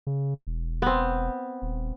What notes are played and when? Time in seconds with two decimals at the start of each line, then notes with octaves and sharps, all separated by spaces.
0.07 C#3
0.47 E1
0.82 B3 C4
1.62 D#1